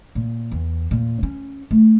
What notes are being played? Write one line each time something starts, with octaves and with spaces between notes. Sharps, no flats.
A#2
E2
A#2
C#4
A3